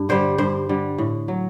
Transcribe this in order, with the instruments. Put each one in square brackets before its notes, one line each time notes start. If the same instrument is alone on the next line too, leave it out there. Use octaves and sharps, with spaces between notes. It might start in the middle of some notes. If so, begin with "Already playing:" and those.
Already playing: [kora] G2
D3 G3 C5
G2 C5
D3 G3
A2
F#3